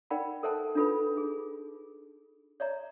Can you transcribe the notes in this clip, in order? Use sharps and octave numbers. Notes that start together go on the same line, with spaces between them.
D#4 A#4 D5 F#5 G5 B5
A4 A#4 C5 E5 G#5 A5
D4 D#4 F4 A4 B4 B5
G#4
C#5 D5 E5 A#5